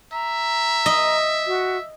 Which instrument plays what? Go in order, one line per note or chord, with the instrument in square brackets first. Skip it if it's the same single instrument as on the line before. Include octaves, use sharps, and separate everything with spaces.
[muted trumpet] E5 [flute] A#5
[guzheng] D#5
[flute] F#4